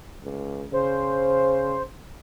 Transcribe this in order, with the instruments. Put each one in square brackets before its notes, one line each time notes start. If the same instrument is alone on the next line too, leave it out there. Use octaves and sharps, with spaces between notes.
[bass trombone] C#2
[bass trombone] C#3 [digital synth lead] C5